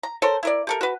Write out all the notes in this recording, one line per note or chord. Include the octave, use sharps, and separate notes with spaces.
A#5
A4 A#4 C5 C#5
E4 A#4 D5
G4 A4 A#4
F#4 B4